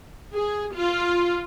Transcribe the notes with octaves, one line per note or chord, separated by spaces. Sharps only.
G#4
F4